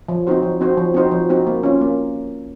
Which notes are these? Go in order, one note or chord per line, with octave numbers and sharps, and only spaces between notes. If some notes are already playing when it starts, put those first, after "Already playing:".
F3
C4 D#4 F#4 C5
F3
C4 D#4 F#4 C5
F3
C4 D#4 F#4 C5
F3
C4 D#4 F#4 C5
A#3
C#4 F4
A#3